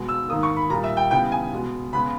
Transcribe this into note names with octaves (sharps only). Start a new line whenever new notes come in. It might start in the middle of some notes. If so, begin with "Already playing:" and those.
Already playing: B2 G#3 B3
E6
G#2 D#3 A#3 D#6
C#6
B5
A#2 G3 A#3 A#5
E5
G5
C#3 E3 G3 B3 G5
G#5
B2 G#3 B3
C#3 G#3 B3 B5